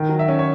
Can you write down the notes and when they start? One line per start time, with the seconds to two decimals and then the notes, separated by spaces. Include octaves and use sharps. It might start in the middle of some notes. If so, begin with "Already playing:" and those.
Already playing: D#3
0.09 F#3
0.19 E5
0.28 C#4
0.39 C#5